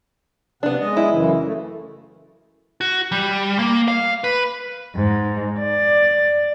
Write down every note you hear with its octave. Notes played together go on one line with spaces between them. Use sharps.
C3 B3 D4 F#5
G#3 D#5
E4
F#2 C#3 E3
A3
F#4
G3
A#3
F5
B4
G#2
D5